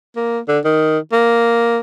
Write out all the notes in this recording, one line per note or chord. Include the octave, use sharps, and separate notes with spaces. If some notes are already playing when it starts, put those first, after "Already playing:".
A#3
D3
D#3
A#3